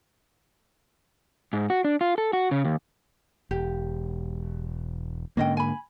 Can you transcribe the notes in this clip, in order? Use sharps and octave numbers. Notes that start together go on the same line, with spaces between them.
G#2
F#4
D4
F4
A4
F#4
C#3
D#2
E1 G4
G#2 D3 A#3 C#4 D#5 G5
G#5 B5